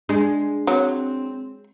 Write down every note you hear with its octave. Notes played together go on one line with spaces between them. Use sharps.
G#3 D4
F#3 C4